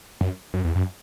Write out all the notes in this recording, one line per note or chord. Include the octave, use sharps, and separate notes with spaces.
F#2
F#2
E2
F#2